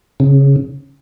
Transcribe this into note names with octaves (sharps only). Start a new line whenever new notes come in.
C#3